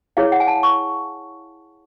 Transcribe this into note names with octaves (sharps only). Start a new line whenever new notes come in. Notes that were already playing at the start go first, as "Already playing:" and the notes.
E4 G#4 C#5 F5
F#5
G#5
A5
C#6